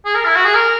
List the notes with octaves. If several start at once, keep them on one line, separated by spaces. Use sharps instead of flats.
G#4
A#4
E4
F#4
G#4
A#4